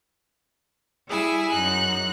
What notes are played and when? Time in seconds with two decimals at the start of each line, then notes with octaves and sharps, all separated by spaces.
1.07 G3 E4 G#4 G#5 E6
1.53 F#2 D#4 F#6